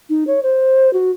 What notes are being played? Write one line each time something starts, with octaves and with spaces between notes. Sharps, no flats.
D#4
C#5
C5
F#4